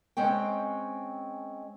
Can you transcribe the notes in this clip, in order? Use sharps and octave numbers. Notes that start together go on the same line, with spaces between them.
G#3 C4 C#4 G5